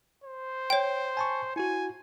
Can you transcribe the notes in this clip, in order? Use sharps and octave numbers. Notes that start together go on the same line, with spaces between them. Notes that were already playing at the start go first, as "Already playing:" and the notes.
C5
C#5 G5
G#5 A5 C#6
E4 F#4 G#5